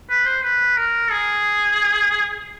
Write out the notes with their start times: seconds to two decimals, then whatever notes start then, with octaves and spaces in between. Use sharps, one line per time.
0.09 B4
0.25 C5
0.43 B4
0.77 A#4
1.11 G#4